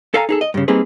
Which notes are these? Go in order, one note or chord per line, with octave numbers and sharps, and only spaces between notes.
A4 F5 G#5 A#5
D#4 G#4 A4
D#5
G2 C#3
G3 A#3 C4 D#4 G#4 B4